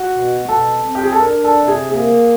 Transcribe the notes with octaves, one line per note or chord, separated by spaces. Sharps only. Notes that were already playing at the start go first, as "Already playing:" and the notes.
Already playing: F#4
B2
B2 A4
C4
G4
G#4
A4
D4 A#4
A4
C3
G#4
A#3 G#4